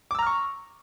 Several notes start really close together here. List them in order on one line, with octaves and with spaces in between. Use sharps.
D6 E6 A#5 F6 C#6